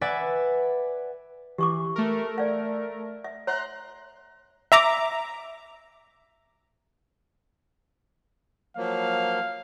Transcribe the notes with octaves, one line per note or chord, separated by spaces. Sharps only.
B4 D5 E5 F#5 G#5
E3 G4 C#6 D6
A3 A#4
D5 F5
E5
C#5 E5 A#5 C6 F#6
E5 A#5 D6
F3 F#3 A#3 F5